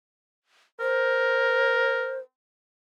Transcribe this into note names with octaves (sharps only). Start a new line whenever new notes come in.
A#4 C5